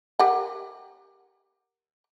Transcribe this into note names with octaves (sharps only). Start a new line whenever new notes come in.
G4 A#4 F#5